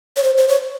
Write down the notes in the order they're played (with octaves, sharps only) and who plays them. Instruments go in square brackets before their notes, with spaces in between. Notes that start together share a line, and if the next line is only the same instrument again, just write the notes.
[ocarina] C#5
C5
C5
C#5